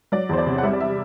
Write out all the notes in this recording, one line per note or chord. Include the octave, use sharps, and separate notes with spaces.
F#3 D5
E2 C5
D5
C3
F#5
G3 E5
D5
E5